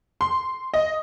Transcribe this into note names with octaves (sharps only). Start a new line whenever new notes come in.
C6
D#5